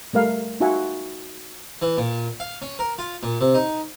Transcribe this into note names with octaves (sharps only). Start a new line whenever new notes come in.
G3 A3 A#4 F5
D#4 F4 F#4 E5 F#5 G#5
E3
A#2
F5
C#4
A#4
F4
A#2
C3
D#4